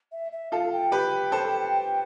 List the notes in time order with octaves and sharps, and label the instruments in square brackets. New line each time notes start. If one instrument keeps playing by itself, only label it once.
[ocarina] E5
E5
[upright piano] F4 A4 [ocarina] F5
[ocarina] G5
[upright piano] G4 B4
A4 C5